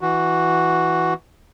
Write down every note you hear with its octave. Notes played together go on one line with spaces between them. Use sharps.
E3 F#4